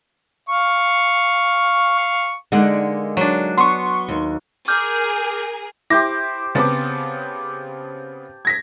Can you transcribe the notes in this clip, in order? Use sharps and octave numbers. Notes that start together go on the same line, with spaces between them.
F5 C#6
D3 G#3 A#3 D#4 F#5
F#3 D4
B3 C6 C#6
D#2
G#4 A#4 D6 F6 G6
E4 G4 C5 D6 A#6
C#3 B3 C4 A5 D6
G#6 A#6 B6